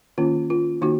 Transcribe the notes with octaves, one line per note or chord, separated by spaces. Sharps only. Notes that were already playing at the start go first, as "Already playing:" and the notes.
D#3 A#3 C#4 F4
F4
D#3 A#3 D#4 F#4